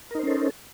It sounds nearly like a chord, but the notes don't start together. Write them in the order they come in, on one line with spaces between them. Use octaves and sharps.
A#4 D#4 C5 C#4 A4